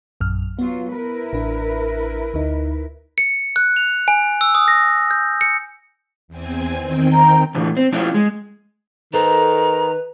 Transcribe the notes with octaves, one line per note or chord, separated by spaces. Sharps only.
A#1 F#2 F6
F#3 B3 F4
E4 A#4 B4
A1 D4
D2 D#4
C#7
F#6
F7
G#5
E6
D#6
A#6
G6
C#7
E2 C4 G#5
D#3 C4 G5
A#5
A2 D3 E3
C4
F3 C#4 E4
G#3
D#3 A4 B4 C5 A#5